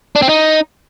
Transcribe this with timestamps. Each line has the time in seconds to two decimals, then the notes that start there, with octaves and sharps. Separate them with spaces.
0.16 D4
0.22 C4
0.29 D#4